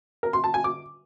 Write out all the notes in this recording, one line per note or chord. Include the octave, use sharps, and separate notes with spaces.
A#4
C6
A5
G#5
D6